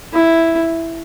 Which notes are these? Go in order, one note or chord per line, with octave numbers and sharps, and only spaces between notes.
E4